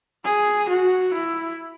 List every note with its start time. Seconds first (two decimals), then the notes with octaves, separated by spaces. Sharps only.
0.25 G#4
0.69 F#4
1.14 E4